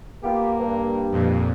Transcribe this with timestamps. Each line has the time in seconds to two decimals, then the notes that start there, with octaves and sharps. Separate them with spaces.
0.24 A#3 B3 F4 G4
0.59 G2
1.12 F2 A#2